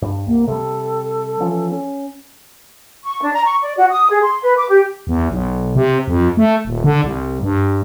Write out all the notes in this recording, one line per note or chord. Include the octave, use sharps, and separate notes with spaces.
G2
C2 A#3
C3 G3 A4
E3 F3 C#4
C#4
C#6
D4
A#5
C#6
D5
F#4
D#6
G#4
C6
B4
D6
G4
E2
B1
C3
F2
A3
D#1
D3
C2
G2